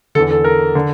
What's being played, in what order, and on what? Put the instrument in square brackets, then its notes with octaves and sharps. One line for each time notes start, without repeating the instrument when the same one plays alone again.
[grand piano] D3 A4
E2
A4
A#4
D3